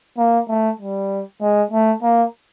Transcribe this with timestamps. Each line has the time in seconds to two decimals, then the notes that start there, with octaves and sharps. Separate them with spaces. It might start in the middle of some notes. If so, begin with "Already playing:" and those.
0.18 A#3
0.49 A3
0.80 G3
1.41 G#3
1.71 A3
2.03 A#3